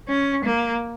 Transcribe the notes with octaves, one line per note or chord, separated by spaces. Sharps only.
C#4
A#3